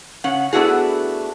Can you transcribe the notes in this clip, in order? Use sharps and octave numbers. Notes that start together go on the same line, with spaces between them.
C#3 C#4 F#5
A3 B3 D4 E4 F#4 G#4